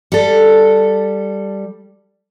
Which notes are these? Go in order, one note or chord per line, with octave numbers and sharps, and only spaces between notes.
G3 A4